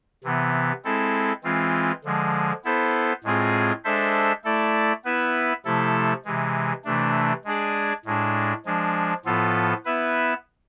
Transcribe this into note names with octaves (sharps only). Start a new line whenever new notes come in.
C3 E3 B3
G#3 C4 E4 A4
E3 G#3 C4 F4
D3 F3 G#3
B3 E4 A4 C5
A2 G#3 C4 F4 G#4
G#3 D4 A4 C5 E5
A3 E4 A4 D5
B3 E4 B4 E5
C3 F3 A3 E4 A4
C3 E3 G#3
C3 E3 A3 D4
G#3 D4 G#4 D5
A2 G#3 D4
F3 G#3 D4
A2 F3 B3 F4 A4
B3 E4 B4 E5